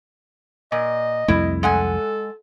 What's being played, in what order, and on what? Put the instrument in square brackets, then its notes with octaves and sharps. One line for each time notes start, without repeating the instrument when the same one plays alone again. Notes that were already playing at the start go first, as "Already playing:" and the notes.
[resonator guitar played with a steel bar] A#2 [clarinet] D#5
[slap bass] C2 F2 A3 [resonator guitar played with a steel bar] E4
[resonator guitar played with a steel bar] G#3 F#5 G#5 [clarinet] A4